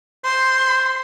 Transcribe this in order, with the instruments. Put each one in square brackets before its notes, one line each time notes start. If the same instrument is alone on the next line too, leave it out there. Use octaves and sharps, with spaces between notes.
[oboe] C5 [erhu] C6